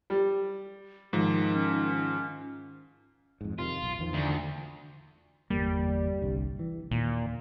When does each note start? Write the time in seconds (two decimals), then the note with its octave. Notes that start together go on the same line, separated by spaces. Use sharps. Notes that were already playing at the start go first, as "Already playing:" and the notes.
0.10 G3
1.13 G#2 D#3 F3
1.55 C#4
3.41 F2 G#2
3.59 F2 C3 D#3 F4
3.82 B1
3.99 E2 D#3 F3
4.14 D2
5.50 G1 E2 G3 A#3
6.22 G1 C2 G2
6.59 E3
6.91 D#2 A#2